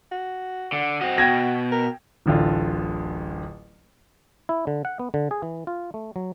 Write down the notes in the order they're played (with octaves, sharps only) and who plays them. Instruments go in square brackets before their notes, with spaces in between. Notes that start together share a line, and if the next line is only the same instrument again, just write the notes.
[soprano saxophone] F#4
[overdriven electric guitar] D3
[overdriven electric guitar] C4 D#5 [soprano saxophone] F#4
[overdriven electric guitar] B2 [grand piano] G5 G#6 A#6
[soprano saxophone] A#4
[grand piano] D1 A1 D3 F4
[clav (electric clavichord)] E4
D3
F#5
B3
D3
G#4
E3
F4
A3
F#3